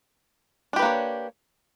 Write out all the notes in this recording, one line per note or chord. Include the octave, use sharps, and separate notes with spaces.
A#3 D4 G4 B4 C#5